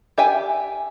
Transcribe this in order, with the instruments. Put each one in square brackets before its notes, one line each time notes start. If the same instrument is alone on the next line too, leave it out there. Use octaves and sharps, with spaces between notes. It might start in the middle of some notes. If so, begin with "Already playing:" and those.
[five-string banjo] G4 E5 G5 G#5